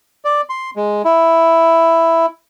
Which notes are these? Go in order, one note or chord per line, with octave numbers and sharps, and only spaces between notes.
D5
C6
G#3
E4